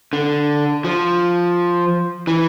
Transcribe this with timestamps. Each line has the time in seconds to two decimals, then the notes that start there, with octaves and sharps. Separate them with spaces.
0.13 D3
0.84 F3
2.27 E3